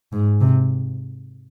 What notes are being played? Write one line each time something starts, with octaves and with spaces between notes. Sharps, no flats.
G#2
C3